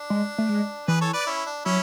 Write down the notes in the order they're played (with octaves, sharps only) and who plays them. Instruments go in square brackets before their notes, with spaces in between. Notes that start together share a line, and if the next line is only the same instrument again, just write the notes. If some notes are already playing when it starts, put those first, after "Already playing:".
Already playing: [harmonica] D4
[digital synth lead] G#3
A3
G#3
[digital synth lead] E3 [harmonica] G#4 B4
[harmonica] A4 C#5
B4 D5
C#4 E4
D4
[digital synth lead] F#3 [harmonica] C#4 E4